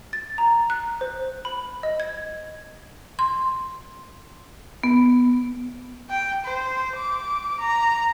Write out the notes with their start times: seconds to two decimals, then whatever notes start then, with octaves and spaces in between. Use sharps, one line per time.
0.13 A6
0.38 A#5
0.70 F#6
1.01 C5
1.45 B5
1.83 D#5
2.00 G#6
3.19 C6
4.83 B3
6.10 G5
6.44 C5
6.96 D6
7.60 A#5